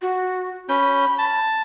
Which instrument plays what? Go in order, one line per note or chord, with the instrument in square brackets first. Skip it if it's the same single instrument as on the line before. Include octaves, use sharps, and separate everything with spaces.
[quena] F#4
[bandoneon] C#4 G6 [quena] B5
[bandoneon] A5